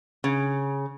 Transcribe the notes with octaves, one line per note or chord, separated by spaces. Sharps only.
C#3